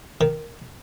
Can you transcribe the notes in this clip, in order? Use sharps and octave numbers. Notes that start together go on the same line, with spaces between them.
D#3